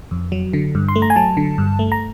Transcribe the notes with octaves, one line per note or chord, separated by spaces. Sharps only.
F2
F#3
D3
G2
C6
A3
A#5
G#5
F#3 A5
D3
G2
A3
A#5